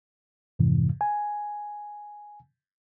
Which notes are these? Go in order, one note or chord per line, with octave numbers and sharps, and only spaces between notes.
F2 G#2 C3 E3
G#5